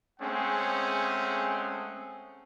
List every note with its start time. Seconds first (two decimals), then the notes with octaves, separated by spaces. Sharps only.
0.20 G#3 A3 C4 C#4 G#4 F#5